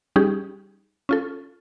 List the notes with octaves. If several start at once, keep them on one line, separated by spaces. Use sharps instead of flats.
G3 C#4 D#4 G4 G#4
C#4 F4 A4